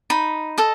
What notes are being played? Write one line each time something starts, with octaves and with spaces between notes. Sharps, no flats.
D#4 B5
A4 D#5